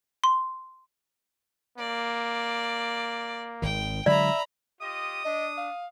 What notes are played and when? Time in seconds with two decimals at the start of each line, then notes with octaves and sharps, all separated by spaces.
0.24 C6
1.78 A#3 D5
3.62 G#1 D#3 G5
4.06 D3 F#3 G#3 D5 E5 A#5 B5
4.81 F4 G4 D#5 D#6
5.25 D4 D#5
5.57 F5